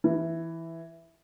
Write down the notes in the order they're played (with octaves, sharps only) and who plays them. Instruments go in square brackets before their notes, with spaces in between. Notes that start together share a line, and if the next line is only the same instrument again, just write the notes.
[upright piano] E3